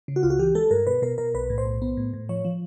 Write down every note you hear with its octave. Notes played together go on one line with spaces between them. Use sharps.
C#3
F#4
C#2 F4
F#4
E3 G4
G#3 A4
G2 A#4
B2 B4
B2 A#4
B2 A#4
B1 B4
A2
C5
B1
B3
A2
A2
F3 C#5
F3